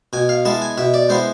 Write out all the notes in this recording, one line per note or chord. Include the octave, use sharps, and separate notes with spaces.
B2 G#5
F5
G#3 B3 E4 A5
G#5
B2 E5
D5
G#3 B3 E4 C5